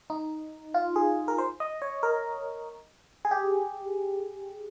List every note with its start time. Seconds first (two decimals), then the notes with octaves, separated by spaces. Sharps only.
0.10 D#4
0.74 F4
0.96 G#4
1.28 A#4
1.38 C5
1.60 D#5
1.82 C#5
2.03 A#4
3.25 G#4
3.31 G4